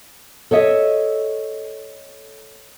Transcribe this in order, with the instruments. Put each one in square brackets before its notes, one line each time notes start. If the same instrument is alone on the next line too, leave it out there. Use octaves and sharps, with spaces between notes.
[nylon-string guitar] A4 C#5 D#5 E5